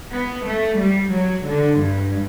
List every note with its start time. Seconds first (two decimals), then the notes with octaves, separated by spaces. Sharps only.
0.12 B3
0.45 A3
0.79 G3
1.13 F#3
1.47 D3
1.80 G2